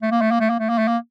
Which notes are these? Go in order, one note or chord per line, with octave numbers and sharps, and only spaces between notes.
A3
A#3
A3
A#3
A3
A#3
A3
A#3
A3
A#3